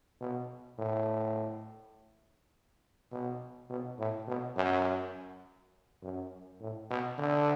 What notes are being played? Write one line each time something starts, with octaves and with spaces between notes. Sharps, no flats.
B2
A2
B2
B2
A2
B2
F#2
F#2
A2
B2
D3